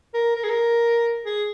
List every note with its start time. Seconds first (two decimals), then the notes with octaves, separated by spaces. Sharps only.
0.14 A#4
0.36 A#4
0.44 G#4
0.50 A#4
1.25 G#4